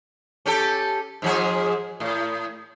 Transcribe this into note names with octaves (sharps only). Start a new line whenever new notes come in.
C#4 G4 A4
G#2 F3 G#4
A2